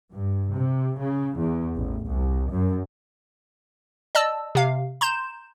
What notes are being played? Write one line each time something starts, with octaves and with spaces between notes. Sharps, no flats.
G2
C3
C#3
E2
A1
C2
F#2
D5 D#5 A5 E6
C3 F5
A#5 C6 G6 E7